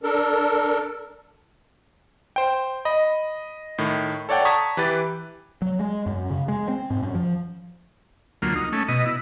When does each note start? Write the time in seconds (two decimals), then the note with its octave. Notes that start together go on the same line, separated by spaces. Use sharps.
0.03 D4 A4 A#4
2.36 C5 G5
2.85 D#5 B5
3.78 A2 D#3
4.29 A4 C#5 D5 F#5 G5
4.45 A5 A#5 C#6 D#6 G#6 B6
4.77 E3 G4 B4 A6
5.62 F#3
5.79 G#3
6.06 F#2
6.30 C#3
6.48 G#3
6.69 C4
6.90 G#2
7.02 F#2
7.15 F3
8.42 D2 F#3 A#3 F4
8.56 D#4
8.73 A3 C#4
8.88 B2 D#5
9.06 E4